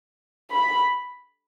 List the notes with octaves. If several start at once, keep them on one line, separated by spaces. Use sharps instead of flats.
B5